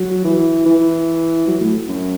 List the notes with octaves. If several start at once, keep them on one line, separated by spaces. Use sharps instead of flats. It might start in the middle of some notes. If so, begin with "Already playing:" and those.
Already playing: F#3
E3
E3
F#3
A2
F#2